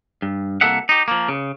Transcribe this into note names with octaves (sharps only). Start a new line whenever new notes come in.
G2
C2 D#3 A#3 A4 E5 F#5
D#4 G4
F3 A#3
C#3